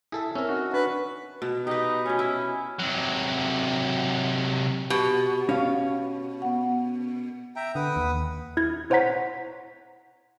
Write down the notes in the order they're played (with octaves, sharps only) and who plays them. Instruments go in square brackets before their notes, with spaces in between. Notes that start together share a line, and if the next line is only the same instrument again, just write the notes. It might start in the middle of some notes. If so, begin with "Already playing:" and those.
[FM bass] E4 [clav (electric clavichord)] G#4 A4 E5
[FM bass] C4 [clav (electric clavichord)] C#4 A#4 [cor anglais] E5
[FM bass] D#4 [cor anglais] F#4
[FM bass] D4 [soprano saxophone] B4
[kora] B2
[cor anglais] D#4 [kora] G4 B4
[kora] B2 C#5 [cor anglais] C#4
[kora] E4
[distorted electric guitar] C3 F#3
[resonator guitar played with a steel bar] B2 [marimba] G4
[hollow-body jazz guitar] C#4 C#5 F5
[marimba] B3 F#5
[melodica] E5 G5 A#5
[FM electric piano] D3 [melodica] B4 F#5 D#6
[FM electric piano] D#2
[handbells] E4 G#6
E4 C5 C#5 F#5 A#5 B6